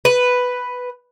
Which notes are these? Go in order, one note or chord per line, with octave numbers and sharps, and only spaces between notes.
B4